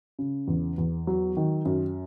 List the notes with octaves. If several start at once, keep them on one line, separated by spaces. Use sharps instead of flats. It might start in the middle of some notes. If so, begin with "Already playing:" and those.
C#3
E2
E2
F#3
D#3
F#2